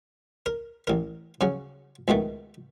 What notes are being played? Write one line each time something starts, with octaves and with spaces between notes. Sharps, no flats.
A#4
A1 A#4
C#3 F#3 C#4
C#2 B2 D#3 A3